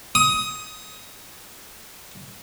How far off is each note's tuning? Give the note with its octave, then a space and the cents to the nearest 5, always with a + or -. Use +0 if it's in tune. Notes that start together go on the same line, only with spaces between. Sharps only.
D#6 +20